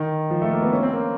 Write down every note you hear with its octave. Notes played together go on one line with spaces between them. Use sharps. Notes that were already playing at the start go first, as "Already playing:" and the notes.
Already playing: D#3
F3
A3
A#3
B3
C#4
C4
A#3